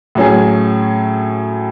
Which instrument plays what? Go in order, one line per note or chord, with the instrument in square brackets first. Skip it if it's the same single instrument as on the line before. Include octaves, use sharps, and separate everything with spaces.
[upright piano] A2 F#3 C#4 G#4